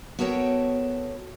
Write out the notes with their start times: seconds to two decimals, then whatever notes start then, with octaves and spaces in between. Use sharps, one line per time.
0.19 B3 F#4 A4 A#4 C#5 G5